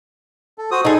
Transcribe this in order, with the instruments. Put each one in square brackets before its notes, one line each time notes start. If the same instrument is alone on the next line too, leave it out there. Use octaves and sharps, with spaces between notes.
[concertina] A4
F#4 C5 D#6
[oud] D#4 G#4 [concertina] A4